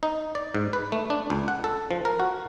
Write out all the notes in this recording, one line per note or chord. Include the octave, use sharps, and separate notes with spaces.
D#4
D5
G#2
B4
A3
D4
C#2
F#5
A4
F3
A#4
F#4